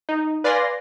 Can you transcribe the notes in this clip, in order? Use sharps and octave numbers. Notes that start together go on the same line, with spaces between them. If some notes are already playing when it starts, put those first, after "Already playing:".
D#4
B4 D5 F5 G#5 C6 A#6